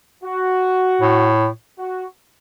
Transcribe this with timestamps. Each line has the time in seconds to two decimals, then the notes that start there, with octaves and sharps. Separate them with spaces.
0.24 F#4
1.01 A2
1.79 F#4